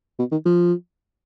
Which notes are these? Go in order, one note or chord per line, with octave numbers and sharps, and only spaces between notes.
B2
D#3
F3